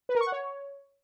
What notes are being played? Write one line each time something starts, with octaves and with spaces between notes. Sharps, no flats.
B4
A#4
C#6
F#5
C#5